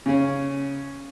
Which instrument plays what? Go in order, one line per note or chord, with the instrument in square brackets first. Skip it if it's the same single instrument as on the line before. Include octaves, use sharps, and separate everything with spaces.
[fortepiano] C#3 C#4